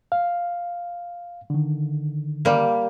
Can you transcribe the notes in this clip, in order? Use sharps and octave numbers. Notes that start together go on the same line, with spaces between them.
F5
D3 D#3
G3 A#3